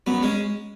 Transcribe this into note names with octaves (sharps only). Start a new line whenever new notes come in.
F#2 B3
G#3 C#4